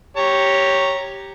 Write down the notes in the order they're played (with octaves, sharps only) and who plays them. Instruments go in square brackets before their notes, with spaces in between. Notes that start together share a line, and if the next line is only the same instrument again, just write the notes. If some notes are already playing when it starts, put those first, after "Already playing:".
[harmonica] G4 C#5 A#5